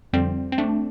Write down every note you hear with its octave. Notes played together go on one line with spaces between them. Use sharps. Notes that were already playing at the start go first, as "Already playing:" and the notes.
F2 D3 F3 G3 C4
C4
A3 D4